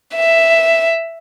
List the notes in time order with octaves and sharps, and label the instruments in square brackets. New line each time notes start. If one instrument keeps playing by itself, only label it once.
[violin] E5